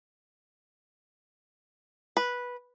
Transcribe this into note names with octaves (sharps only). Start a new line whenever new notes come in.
B4